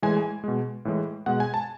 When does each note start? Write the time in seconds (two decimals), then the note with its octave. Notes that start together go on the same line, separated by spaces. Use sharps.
0.02 A2 E3 G#3 G#5
0.17 G#5
0.44 B2 G#3
0.85 A2 E3 G#3
1.26 B2 G#3 F#5
1.40 G#5
1.54 A5